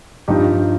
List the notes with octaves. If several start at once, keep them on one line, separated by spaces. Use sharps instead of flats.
G2 F3 D#4 G4